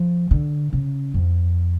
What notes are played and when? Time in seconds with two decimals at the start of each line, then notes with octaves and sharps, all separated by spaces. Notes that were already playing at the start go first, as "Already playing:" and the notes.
Already playing: F3
0.31 D3
0.73 C#3
1.14 F2